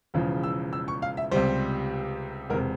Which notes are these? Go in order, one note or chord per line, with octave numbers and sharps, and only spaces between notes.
E1 E2 C#3 F3
E6
E6
C#6
F5
E5
C#2 C3 G3 C5
E1 C3 A#4